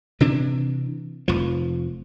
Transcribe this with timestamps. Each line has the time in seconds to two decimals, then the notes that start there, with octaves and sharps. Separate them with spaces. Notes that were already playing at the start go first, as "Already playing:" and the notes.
0.20 C3 E3 D4
1.28 F1 F3